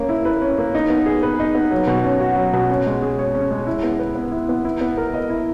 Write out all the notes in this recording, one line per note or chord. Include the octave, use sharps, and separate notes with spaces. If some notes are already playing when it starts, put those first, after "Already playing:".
Already playing: A#3 C#4
E4
B4
C#4
A#3
D#4
B3
G#4
B4
D#4
B3
F#3
B2
C#4
F#4
F#3
B2
C#4
G#3
G#4
C#5
C#4
G#3
E4
B3
B4
B3
E4
B3
E4
B3
A#4
D#5
E4